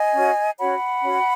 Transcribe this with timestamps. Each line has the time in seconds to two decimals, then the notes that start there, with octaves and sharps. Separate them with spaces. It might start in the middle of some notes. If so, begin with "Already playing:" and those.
Already playing: D#5 G#5
0.13 C#4 F#4 C#5
0.58 C#4 F#4 C#5 F#5 B5
1.03 C#4 F#4 C#5